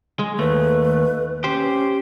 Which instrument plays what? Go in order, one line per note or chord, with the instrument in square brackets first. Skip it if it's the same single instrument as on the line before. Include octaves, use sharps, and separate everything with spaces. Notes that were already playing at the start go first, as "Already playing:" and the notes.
[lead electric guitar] G#3
[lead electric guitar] D#2 A3 [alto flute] B4
[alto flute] C#4 [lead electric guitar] G4 C5